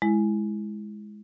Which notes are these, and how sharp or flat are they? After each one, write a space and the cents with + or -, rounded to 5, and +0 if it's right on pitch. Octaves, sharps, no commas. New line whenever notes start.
G#3 +10 E4 +5